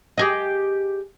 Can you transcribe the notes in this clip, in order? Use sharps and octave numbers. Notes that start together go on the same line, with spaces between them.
G4 G#4 D#5